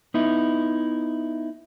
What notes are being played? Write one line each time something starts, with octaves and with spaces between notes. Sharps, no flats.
B3 D#4 E4